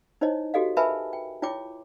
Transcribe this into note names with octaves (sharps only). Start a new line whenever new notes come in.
D#4 E4 C5 C#5 D#5
F#4 G4 A4 D#5 F5
A#4 B4 E5 G#5 A5 B5
G5
E4 F4 C#5 G5 D6